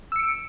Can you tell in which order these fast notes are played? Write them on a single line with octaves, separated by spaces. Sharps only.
E6 C#7 D7